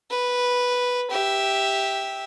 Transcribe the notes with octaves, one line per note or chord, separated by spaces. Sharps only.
B4
G4 E5